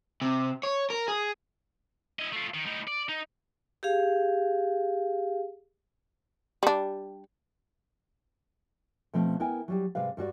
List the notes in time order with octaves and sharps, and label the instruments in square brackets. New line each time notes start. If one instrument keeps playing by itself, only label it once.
[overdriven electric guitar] C3
C#5
A#4
G#4
[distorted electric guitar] E4 D#5
A3 F4
D#3
A2 D#4
D5
D#4
[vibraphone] G4 G#4 F5
[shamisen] G3 D4
[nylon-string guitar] B2 F3 A3 C4
B3 E4 A#4 G5 G#5
F#3 G3 G4
G#2 C3 G3 B4 F5
G2 G3 F#4 D5